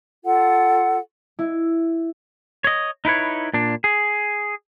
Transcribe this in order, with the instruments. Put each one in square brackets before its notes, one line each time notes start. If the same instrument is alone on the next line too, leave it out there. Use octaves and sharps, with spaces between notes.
[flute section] F4 A4 F#5
[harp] E4
[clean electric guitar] C#5 D#5
D#4 E4 B4 C#5
A#2 D4
G#4